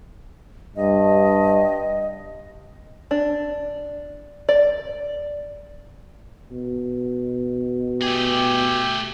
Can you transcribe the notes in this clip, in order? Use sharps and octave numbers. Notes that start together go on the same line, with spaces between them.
G2 D#5
D4
D5
B2
A3 G4 G#4